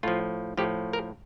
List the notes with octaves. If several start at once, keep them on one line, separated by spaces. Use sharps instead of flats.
A2 F3 F4
A2 F3 G4
A#4